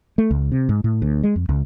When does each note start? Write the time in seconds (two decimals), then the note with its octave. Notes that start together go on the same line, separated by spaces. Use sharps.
0.18 A3
0.31 C#2
0.52 C3
0.69 G#2
0.84 A2
1.02 D2
1.23 G#3
1.36 F2
1.49 C#2